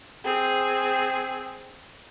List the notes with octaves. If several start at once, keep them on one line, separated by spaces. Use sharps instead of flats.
C4 G#4